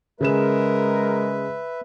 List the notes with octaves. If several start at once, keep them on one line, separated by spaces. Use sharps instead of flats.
C#3 G#3 G#4 A#4 B4 E5 E7